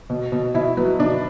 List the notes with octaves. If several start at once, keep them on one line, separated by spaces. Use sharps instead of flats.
B2
B2
B2 E4
F#3 B3
B2 D4